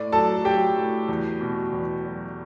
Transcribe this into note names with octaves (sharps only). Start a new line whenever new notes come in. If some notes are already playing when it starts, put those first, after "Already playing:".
Already playing: A2 D5
F#3 A4 A5
F#3 G4 G5
A2
E2
B2
E2
F#3